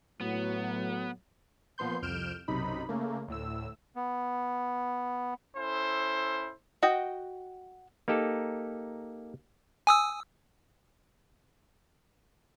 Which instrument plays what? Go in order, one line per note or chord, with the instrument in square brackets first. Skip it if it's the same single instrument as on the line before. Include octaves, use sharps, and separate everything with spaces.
[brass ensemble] A2 F#3 [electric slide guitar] B3
[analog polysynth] A#2 F3 B3 C6 G6
C2 F2 F6 G6 D7 E7
B1 F#2 C3 D#4 B5
C#3 A3 A#3
D2 A2 E6
[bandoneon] B3
[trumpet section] C#4 E4 A4 C5
[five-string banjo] F#4 D#5 G5
[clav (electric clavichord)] A#3 D#4 G4 A4
[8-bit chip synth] G#5 D#6 E6